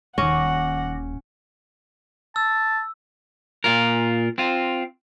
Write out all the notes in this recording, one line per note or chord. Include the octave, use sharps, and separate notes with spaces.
D#1 A#2 D#3 C#4 F#5 D6 A#6
A5 E6
A#2 F4 A#4
C4 F4